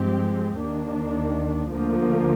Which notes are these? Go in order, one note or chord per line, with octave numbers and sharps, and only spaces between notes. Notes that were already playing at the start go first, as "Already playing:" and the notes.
Already playing: G2 F3 G#3 C4 G4
D#2 D#3 A#3 D4
D2 D3 F3 A#3